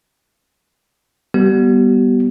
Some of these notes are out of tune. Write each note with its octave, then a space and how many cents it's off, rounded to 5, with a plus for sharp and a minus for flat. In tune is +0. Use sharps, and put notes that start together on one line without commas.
G3 +0 B3 -15 G4 -40